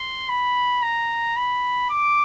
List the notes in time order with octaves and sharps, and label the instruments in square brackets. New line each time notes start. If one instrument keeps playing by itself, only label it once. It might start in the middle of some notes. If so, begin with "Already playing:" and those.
Already playing: [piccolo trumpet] C6
B5
A#5
B5
D6